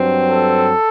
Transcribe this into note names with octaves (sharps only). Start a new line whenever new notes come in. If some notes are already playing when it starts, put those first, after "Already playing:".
Already playing: G2 F#3 C4
A4